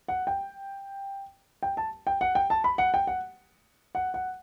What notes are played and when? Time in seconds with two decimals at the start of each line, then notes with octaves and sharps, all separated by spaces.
0.08 F#5
0.27 G5
1.63 G5
1.77 A5
2.07 G5
2.21 F#5
2.35 G5
2.50 A5
2.64 B5
2.78 F#5
2.94 G5
3.07 F#5
3.95 F#5
4.14 F#5